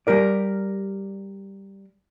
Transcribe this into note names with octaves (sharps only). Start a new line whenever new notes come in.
G3 G4 A#4 D5